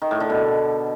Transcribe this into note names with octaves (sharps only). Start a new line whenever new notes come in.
D#3
A2
D3
B2